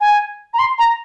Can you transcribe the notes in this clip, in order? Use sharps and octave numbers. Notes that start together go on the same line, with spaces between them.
G#5
A#5
C6
A#5